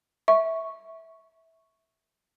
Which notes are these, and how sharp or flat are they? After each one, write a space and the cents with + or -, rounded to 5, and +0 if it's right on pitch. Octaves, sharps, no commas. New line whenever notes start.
E5 -15 C#6 +0